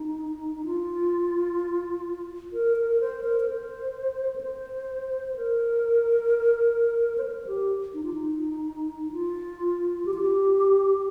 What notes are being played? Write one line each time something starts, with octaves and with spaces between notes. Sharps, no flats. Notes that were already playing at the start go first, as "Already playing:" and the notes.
Already playing: D#4
D#4
F4
A#4
A#4
C5
A#4
A#4
C5
A#4
C5
A#4
C5
A#4
G4
D#4
F4
D#4
F4
G4
F4
G4